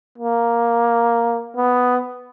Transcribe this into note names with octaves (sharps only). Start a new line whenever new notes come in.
A#3
B3